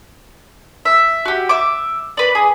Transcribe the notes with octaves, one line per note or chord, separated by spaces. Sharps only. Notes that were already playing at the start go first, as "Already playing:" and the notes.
E5
F#4 G4
E5 D6
B4 D5
G#4